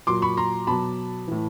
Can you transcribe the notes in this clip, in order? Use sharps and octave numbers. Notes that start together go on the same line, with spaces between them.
A#2 F#3 C6 D6
B5 C#6
A#5 C6
B2 F#3 A5 B5
A2 E3